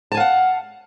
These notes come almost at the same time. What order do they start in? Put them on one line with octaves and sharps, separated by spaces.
A5 G#5 F5 F#5